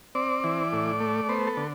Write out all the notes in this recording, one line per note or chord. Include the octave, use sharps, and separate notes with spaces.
C4 D5
E3
A2
A3
B3 C5
A4
D3